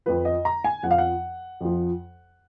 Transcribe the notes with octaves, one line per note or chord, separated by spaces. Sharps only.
F2 F3 B4
D#5
A#5
G#5
F2 F3 F#5
F5
F#5
F2 F3